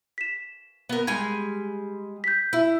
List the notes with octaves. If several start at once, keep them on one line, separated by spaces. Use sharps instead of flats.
B6 E7
B3 A#4
G3 G#3 G#5 G#6
G6 B6
E4